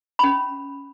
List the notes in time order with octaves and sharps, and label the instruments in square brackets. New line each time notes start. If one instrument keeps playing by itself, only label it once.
[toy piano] C#4 B5